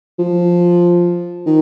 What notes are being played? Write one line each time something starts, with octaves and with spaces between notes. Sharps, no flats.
F3
D#3